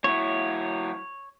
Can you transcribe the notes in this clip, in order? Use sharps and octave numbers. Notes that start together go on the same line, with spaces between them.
F#3 E4 C#5